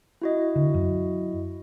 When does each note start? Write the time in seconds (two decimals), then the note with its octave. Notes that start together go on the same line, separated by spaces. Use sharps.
0.22 E4 F#4 D#5
0.56 D3
0.74 F#2